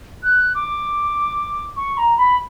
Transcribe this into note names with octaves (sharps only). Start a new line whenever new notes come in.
F#6
D6
C#6
A#5
B5